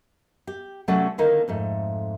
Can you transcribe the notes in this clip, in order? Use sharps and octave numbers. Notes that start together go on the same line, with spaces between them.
G4
C3 F#3 A3 C#4 D5 F#5
D3 D#3 A#3 D#4
F2 G#2 A3